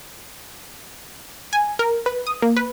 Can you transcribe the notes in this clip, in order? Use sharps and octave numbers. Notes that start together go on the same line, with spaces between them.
G#5
A#4
B4
D#6
A#3
B4